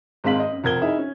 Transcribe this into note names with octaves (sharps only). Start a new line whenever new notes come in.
G#1 G#3 C4 F5 B6 F#7
D#5
F#2
F1 A#4 G#6 G7
D#4 E4 G#4 E5
C#4